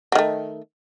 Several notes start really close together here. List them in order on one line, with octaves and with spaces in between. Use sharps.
F#3 D#3 A3